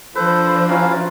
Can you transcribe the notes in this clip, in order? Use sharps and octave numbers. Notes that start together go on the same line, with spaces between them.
F3 D4 A4 B4 C5
F#3 C#4 E4 F4 F5